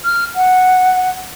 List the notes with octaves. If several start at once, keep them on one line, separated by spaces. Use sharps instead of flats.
F6
F#5